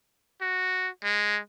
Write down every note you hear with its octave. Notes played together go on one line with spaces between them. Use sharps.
F#4
G#3